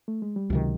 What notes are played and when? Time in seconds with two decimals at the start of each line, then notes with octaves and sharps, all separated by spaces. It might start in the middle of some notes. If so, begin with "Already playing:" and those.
0.08 A3
0.22 G#3
0.36 G3
0.50 C#2 C3 D#3 F#3